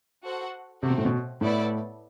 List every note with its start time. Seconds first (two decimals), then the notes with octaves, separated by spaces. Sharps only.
0.24 F#4 A4 C5 F#5
0.82 C3 A3 C4 F#4
0.90 B2
0.98 A2
1.05 B2
1.41 A2 B3 E4 A4 D5